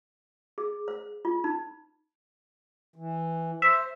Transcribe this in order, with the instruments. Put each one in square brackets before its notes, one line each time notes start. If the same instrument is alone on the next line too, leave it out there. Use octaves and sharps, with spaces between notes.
[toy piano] G#4
C5
F4
D#4
[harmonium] E3
[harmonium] C5 [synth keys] E5